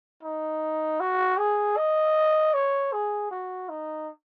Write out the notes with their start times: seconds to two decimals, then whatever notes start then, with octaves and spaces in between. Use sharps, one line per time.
0.23 D#4
1.00 F#4
1.38 G#4
1.77 D#5
2.54 C#5
2.93 G#4
3.31 F#4
3.69 D#4